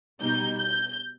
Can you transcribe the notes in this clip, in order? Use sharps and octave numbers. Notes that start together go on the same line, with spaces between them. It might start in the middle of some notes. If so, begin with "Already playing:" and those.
B2 G3 D#4 G6
G6